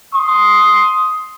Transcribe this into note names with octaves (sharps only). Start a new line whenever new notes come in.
C6 D#6